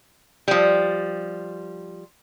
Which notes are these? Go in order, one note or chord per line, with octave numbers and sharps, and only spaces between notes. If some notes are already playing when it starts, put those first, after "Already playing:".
F3 G3